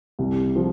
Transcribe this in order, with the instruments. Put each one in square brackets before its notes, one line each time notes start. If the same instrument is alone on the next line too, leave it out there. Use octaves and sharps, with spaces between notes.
[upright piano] C2
F3